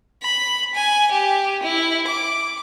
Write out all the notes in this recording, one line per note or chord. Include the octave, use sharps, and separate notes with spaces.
B5
G#5
G4
E4
D6